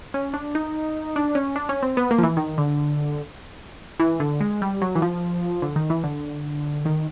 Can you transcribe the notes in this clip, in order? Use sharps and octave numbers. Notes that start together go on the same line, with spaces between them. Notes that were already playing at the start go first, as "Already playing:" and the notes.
C#4
D4
D#4
D4
C#4
D4
C#4
C4
B3
A#3
F3
E3
D#3
D3
E3
D3
G#3
G3
F#3
E3
F3
D3
D#3
E3
D3
D#3